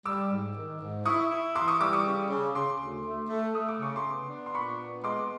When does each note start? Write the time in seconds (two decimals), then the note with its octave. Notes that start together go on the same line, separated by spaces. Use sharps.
0.05 G3 D6 E6
0.31 G#2
0.55 D#3
0.81 G#2
1.05 E4 C#6 D#6
1.31 E4
1.55 E3 C6 D6
1.68 C#6 D#6
1.80 G3 D6 E6
1.93 C#6 D#6
2.06 C#3
2.30 C#3
2.54 C#3 C6 D6
2.80 D2
3.05 A3
3.29 A3
3.54 A3 D#6
3.68 D6
3.79 C#3 C#6
3.96 C6 D6
4.05 B3
4.29 D4
4.46 C6
4.54 A#2 B5 C#6
4.79 B3
5.04 G#3 C6 D6